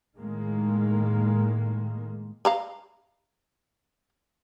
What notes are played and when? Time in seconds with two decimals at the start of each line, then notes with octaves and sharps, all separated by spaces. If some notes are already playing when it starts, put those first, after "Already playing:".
0.19 A2 D#3 G#3 A#3
2.45 F5 A#5 B5